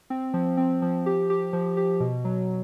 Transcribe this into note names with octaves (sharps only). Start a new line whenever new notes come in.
C4
F3
C4
F3
G4
G4
F3
G4
B2
F#3